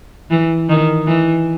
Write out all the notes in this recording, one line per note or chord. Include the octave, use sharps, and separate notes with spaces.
E3
D#3
E3